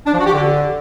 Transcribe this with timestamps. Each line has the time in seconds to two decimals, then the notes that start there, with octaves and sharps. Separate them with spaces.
0.06 D4
0.13 F3
0.20 F#4
0.26 G4
0.33 D3